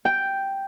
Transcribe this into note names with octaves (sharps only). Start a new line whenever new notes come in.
G5